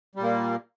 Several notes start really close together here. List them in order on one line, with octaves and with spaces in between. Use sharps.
G3 A#2 A#3